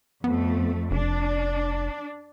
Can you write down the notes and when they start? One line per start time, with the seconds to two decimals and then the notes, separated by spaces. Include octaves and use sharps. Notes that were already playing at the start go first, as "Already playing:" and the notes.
0.24 F2 A3 B3
0.91 F1 D4